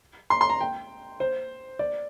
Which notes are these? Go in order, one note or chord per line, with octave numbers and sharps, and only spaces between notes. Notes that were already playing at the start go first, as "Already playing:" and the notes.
C6
C6
A#5
G5
C5
D5